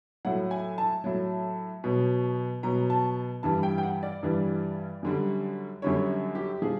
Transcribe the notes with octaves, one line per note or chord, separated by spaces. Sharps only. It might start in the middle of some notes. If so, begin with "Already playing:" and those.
A2 F#3 F#5
G#5
A5
A2 F#3
B2 F#3
B2 F#3 A#5
A5
G2 E3 G3 A5
G5
G5
F#5
D5
G2 E3 G3
F#2 D3 G3
F#2 D3 G3 C#5
G4
F3 G#4